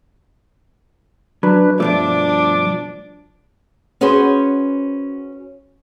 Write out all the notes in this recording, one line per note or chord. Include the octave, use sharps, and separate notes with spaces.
F#3 D4 B4
G2 B2 F3 A3 D4 D6
C#4 F#4 G#4 B4 C5